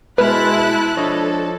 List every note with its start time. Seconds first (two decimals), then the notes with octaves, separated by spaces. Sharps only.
0.18 B2 G#3 E4 B4 E5 A5 F6 F#6
0.97 F3 D4 A4 C#5 D#5